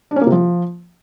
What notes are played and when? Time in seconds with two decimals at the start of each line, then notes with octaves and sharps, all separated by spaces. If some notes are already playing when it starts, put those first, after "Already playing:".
0.11 D4
0.16 C#4
0.21 A#3
0.27 C3
0.32 F3